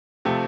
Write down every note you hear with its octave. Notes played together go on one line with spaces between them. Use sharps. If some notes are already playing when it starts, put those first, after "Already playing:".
C3 F3 A3 C4